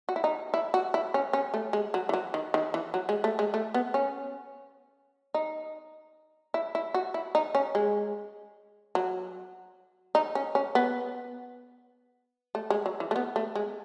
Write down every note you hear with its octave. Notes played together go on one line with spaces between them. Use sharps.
F#4
E4
D#4
E4
F#4
E4
C#4
C#4
A3
G#3
F#3
E3
F#3
D#3
D#3
E3
F#3
G#3
A3
G#3
A3
B3
C#4
D#4
E4
E4
F#4
E4
D#4
C#4
G#3
F#3
D#4
C#4
C#4
B3
A3
G#3
F#3
E3
A3
B3
A3
G#3